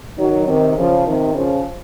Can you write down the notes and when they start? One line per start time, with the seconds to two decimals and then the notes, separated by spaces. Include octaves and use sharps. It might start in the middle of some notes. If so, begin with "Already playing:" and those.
0.18 D#3 F#3
0.48 C3 D#3
0.77 C#3 F3
1.06 C3 D#3
1.34 C#3 F3